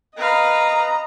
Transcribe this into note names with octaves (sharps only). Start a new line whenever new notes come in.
B4 D#5 F5 A#5